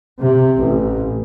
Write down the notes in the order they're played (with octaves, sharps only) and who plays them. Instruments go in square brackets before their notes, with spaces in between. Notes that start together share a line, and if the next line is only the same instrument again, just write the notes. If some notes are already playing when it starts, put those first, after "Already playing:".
[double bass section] C3
A1